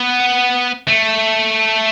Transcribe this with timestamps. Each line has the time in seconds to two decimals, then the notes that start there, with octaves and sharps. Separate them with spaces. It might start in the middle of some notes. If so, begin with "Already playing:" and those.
Already playing: B3
0.88 A3